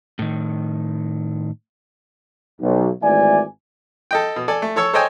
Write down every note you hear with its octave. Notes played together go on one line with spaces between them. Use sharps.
A2 D#3
B1
G#1 E3 A3 D5 E5 G#5
A4 D#5 G5
B2
A4 D5 G#5
A3
A4 C#5 C#6 E6
A4 C5 C#5 D#5 G5 G#5